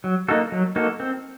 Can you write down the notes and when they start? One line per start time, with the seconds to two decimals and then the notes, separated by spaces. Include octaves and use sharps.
0.04 F#3
0.28 A#3 D#4 F#4 A4
0.52 F#3
0.76 A#3 D#4 F#4 A4
1.00 C4